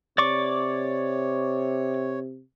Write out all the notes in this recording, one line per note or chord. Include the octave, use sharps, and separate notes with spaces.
C3 C#5 D5 C#6 D6